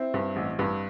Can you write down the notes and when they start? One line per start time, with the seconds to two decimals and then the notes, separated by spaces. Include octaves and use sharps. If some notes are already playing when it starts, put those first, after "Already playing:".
Already playing: C4 E4
0.14 G2
0.36 A1
0.59 G2